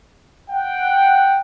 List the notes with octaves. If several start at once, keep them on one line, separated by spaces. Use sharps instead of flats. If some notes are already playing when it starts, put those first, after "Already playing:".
F#5 G5